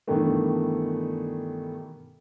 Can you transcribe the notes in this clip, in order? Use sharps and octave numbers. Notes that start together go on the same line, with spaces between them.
G2 B2 D#3 E3 G3 A3